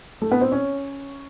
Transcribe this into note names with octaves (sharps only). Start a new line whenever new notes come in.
A3 A4
B3 B4
C4 C5
C#4 C#5